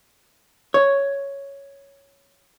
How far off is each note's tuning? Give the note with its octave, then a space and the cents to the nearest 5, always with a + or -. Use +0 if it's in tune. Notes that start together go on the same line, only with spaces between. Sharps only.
C#5 +5